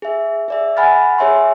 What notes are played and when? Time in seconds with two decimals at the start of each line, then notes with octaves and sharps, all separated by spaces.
0.02 G#4 E5
0.48 G#4 D5 E5
0.77 F#5 G#5 B5 F6 A6
1.18 G#4 C#5 E5 G#5 C6